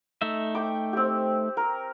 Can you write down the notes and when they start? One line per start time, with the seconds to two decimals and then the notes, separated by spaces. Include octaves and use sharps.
0.22 A3 D#4 E5
0.55 G5 D6
0.93 C4 G4
1.57 A#4